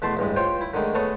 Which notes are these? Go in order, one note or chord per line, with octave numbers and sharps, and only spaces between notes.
E2 B2 A3 A5 C6
A1 G2 G#3
F4 C5 C#5 G5
E4
D3 D#3 G#3 A3
A3 B3 G#4 A4 C#5